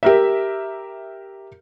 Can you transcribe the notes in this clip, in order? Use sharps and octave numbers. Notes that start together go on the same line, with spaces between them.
G4 A#4 E5